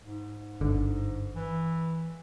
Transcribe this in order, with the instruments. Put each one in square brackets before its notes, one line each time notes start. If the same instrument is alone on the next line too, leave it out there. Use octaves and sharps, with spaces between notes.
[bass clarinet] G#2
[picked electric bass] G1 D3
[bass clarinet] E3